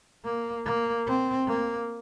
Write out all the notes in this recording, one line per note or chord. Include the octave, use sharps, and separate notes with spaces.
A#3
A#3
C4
A#3